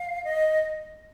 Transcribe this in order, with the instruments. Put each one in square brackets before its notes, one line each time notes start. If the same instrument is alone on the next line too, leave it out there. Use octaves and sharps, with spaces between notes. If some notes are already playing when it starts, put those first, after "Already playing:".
Already playing: [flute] F5
D#5